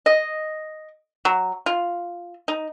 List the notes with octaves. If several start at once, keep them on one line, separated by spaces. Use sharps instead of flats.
D#5
F#3
F4
D#4